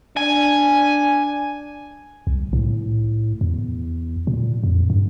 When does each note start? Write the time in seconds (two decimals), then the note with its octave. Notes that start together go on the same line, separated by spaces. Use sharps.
0.17 D4 G#5
2.27 C2
2.53 A2
3.41 E2
4.27 A#2
4.64 F2
4.90 G2